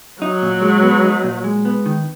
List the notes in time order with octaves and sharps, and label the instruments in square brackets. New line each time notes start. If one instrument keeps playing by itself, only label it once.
[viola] F#3 [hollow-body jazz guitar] D#4
[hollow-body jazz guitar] A#2
G#3
B3
D#4
A#2
G#3
B3
D#3